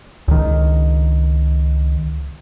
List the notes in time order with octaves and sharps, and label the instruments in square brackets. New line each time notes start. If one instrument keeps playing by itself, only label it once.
[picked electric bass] C#2 D#3